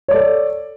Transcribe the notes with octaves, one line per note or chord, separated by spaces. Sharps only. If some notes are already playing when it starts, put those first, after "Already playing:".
A4 C#5 D5